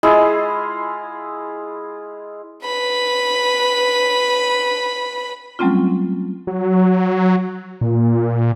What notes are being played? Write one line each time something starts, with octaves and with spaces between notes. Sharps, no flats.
G#3 E4 F4 G#4
B4 B5
F#3 G3 A3 C4 C#4 F4
F#3
A#2